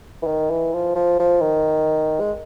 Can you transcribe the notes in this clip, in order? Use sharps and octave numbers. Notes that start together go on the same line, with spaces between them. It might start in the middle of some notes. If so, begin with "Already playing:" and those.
E3
D#3
E3
F3
F3
F3
D#3
G#3